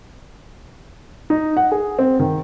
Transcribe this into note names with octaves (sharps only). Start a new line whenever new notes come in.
D#4
F#5
G#4
C4
D#3